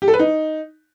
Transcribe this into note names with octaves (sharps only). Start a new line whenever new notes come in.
G4
A4
B4
D#4